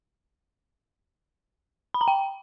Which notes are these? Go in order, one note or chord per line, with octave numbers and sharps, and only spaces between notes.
B5
A#5
G5